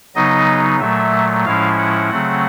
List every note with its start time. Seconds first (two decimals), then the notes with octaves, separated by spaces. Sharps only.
0.15 C#3 F#3 B3 D#4 D#5
0.80 A#2 F#3 A3 E5
1.45 A2 F3 G#3 C#4 E4 F5
1.78 F#5
2.10 C#3 F#3 A3 C4